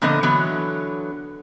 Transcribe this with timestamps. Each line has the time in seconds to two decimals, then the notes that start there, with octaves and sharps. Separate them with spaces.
0.02 A#2 D3 F3 B3 D#5
0.23 D3 E3 F#3 B3